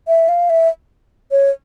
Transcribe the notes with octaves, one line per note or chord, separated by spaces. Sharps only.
E5
F5
E5
C#5